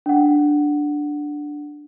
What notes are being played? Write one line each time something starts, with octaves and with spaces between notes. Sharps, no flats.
D4 F#5